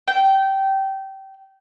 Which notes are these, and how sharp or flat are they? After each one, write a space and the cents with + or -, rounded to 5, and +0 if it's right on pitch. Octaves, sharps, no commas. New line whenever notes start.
G5 -20